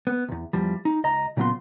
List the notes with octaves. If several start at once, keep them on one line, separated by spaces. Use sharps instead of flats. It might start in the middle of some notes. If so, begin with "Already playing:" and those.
B3
B1 E2
E2 F3 G3
D#4
C#2 D#5 A#5
A#2 C#3 F#3 B3 F4 C6